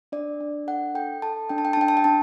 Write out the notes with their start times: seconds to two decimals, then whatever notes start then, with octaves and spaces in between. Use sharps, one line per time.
0.12 D4 D5
0.40 D4
0.67 A4 F#5
0.94 A4 G5
1.22 A4 A5
1.49 D4 G5
1.58 A5
1.65 G5
1.73 A5
1.77 D4 G5
1.88 A5
1.97 G5
2.04 D4 A5